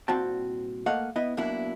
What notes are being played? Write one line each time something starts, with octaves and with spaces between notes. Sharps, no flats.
C2 A#2 C4 F#4 G5 A5
A3 A#3 D#5 F5 F#5
B3 E4 D#5
F#2 B2 A#3 D4 E4